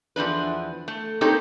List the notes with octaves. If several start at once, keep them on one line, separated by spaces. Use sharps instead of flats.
E2 F3 D4 B4
A3
A#3 C4 D#4 G4 A4 C#5